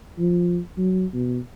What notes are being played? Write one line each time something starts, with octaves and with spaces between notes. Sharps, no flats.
F3
F#3
B2